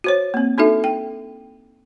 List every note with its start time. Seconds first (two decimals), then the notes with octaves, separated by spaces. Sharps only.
0.04 F#4 C5 C#5
0.34 A#3 C4
0.58 D4 D#4 F#4 A4 E5
0.84 G5